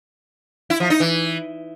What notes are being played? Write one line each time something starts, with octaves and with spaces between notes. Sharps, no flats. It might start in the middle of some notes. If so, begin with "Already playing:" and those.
E4
F3
D#4
E3